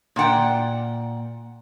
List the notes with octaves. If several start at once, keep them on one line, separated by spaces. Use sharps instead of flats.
A#2 D5 F#5 G5